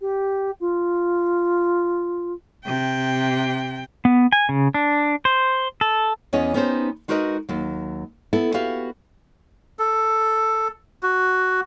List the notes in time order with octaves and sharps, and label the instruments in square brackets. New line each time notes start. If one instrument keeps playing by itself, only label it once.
[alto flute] G4
F4
[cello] C3 G5
[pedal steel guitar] B3
G#5
C#3
D4
C5
A4
[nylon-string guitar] E2 E3 B3 C#4 C#5 D#5
B3 C#4 D#4 G4 A4 C5
G#3 D#4 F#4 A#4 B4 D#5
D#2 F#3
B3 E4 A4
B3 F#4 G4 B4 E5 F5
[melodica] A4
F#4